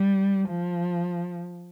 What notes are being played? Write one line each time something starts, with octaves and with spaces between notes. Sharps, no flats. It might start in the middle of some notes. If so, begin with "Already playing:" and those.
Already playing: G3
F3